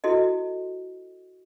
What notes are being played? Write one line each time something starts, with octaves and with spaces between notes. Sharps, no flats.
E4 F#4 A4 D#5